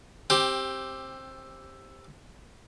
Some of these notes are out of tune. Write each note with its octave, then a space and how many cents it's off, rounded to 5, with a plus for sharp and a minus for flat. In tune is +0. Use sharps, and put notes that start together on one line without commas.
C4 +20 G4 +5